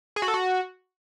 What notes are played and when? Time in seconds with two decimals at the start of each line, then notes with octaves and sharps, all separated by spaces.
0.16 G#4
0.22 F#4
0.28 A4
0.34 F#4